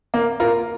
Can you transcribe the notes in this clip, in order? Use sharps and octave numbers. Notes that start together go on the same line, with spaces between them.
A#3
F4 A#4